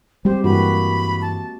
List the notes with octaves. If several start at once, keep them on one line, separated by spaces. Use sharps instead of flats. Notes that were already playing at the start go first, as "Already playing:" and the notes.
G3 G#3 C4 G4 C5
G2 E3 A#3 F#4 B5
A5